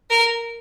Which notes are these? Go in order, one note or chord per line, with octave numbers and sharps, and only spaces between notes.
A#4